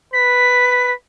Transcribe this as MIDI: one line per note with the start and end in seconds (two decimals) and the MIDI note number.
0.13 0.94 71
0.13 0.92 95